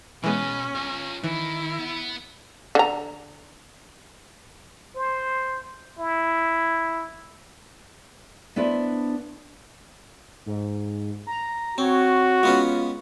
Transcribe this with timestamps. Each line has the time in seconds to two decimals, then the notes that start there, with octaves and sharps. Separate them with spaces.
0.24 B2 E3 G#3 B3 C#4
0.75 G1 F4 C#5
1.24 D#3 E3 E4
1.79 B3
2.75 D3 A#5
4.96 C5
5.99 E4
8.56 B3 D4 E4 B4 C5
10.46 G#2
11.27 A#5
11.78 C4 F#4 C#5
12.43 G#3 B3 C#4 F4